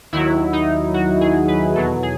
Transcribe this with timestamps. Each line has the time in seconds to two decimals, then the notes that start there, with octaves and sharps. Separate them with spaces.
0.12 D#2 D#3 F#3 E4
0.53 D#4
0.94 F#4
1.21 G#4
1.48 B4
1.75 E2 B2 F#3 A4
2.03 G#4